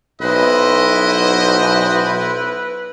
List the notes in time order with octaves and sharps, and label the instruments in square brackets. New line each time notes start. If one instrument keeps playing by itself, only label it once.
[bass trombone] B1 [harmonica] E4 C5 [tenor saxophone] B4 [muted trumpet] D#5